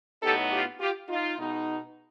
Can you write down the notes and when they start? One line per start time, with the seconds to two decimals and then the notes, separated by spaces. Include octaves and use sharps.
0.23 A2 F#3 B3 D#4 G4 A4
0.52 F4 G4
0.80 F4 G4
1.09 D#4 F4
1.38 B2 G#3 B3 D#4